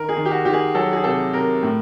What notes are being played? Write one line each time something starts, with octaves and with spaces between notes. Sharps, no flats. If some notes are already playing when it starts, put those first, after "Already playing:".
Already playing: D#3 A#4
G#4
D#3
G4
F#4
D#3 G4
G#4
F#3 A4
G#4
C3 A4
C3 A#4
A2